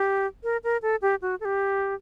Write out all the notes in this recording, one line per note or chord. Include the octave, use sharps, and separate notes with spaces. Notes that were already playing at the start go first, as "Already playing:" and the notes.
Already playing: G4
A#4
A#4
A4
G4
F#4
A4
G4